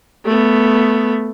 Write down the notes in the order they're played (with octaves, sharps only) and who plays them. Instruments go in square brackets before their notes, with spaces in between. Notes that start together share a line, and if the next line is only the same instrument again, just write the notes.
[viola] A3 B3